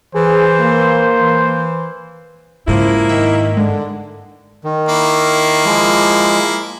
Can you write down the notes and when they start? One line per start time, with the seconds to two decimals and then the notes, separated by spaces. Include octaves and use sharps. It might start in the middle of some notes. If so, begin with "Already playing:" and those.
0.15 E3 G#4 C5
0.60 A#3
1.19 E3
2.68 G#1 G#2 C#3 F3 A#3 E4
3.09 D#3 E5
3.57 D3 G#3
4.64 D#3
4.89 A#3 E4
5.65 F3 G#3